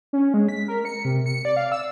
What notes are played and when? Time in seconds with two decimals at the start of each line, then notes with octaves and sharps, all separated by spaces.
0.13 C#4
0.34 G#3
0.49 B6
0.68 A#4
0.85 C#7
1.05 C3
1.26 C#7
1.45 D5
1.56 F5
1.72 E6